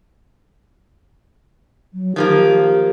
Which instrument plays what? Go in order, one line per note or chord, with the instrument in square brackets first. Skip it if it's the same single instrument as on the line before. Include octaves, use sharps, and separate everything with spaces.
[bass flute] F#3
[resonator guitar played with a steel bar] D#3 F3 A#3 [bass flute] G4